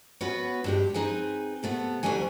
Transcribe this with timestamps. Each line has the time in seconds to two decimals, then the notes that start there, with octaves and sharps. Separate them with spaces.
0.21 B3 C#4 F#4 B4
0.64 G2 G#3 G4
0.94 C4 D#4 G#4 B4 G#5
1.63 C3 A3 B3
2.03 D2 A#2 E3 F#3 G3 G#5